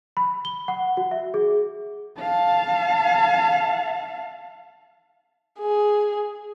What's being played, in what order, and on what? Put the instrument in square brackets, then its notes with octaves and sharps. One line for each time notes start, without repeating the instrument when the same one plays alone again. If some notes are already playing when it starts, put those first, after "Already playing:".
[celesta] B5
G7
F#5
F#4
E5
G#4
[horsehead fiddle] F5 A5
[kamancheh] G#4